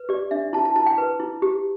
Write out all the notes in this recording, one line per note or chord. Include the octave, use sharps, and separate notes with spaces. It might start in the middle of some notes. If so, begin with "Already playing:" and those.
Already playing: B4
G4 D5
D4 E5
E4 A5
A5
E4 A5
G5
B4
E4
G4